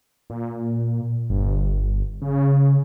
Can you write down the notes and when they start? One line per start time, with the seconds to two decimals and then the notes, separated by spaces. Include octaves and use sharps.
0.30 A#2
1.30 G1
2.21 C#3